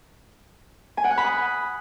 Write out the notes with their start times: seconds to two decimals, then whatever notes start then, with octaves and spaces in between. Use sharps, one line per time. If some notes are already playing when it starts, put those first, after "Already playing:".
0.97 G#5
1.04 F#5
1.11 F#6
1.18 B5
1.24 D#6